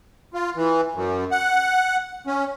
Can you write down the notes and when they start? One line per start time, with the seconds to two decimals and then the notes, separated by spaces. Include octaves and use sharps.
0.34 F4
0.56 E3
0.95 F#2
1.31 F#5
2.27 C#4